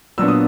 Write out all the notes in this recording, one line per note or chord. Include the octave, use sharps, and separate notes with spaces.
A#2 F#3 B3 D4 E6
D#6